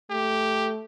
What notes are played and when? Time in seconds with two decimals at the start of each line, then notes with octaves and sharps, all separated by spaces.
0.10 A3 G4